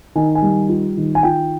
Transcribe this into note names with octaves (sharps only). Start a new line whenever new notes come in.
D#3 G#5
G#5
G3
F4
D#3
G#5
F4 G5